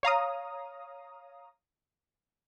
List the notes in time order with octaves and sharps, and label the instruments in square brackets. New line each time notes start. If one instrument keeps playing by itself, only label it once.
[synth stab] C#5 F5 A#5 D#6